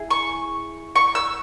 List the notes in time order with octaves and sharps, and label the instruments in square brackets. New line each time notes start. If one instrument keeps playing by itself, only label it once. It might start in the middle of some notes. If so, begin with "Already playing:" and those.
Already playing: [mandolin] E4 G#4
C#6
C#6
E6